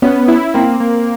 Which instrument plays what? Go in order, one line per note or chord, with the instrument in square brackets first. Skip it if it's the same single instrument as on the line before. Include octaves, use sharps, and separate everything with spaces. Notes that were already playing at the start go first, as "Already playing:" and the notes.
[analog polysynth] B3 [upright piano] C#4
[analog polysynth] E4
[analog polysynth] A#3 [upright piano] C4
[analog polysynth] A#3